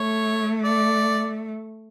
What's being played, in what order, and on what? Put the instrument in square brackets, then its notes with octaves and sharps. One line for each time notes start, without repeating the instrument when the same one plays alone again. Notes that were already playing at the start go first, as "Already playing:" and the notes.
Already playing: [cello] A3 [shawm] C#5
[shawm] D5